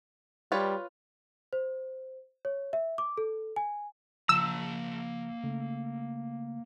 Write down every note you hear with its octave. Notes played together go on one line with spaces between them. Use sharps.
G3 F4 B4 C#5
C5
C#5
E5
D6
A4
G#5
C#3 F3 A#3 A5 A#5 E6
C#3 A3